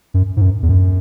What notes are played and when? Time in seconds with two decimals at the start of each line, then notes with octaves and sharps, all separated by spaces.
0.14 F#2
0.37 G#2
0.41 F#2
0.63 E2
0.69 F#2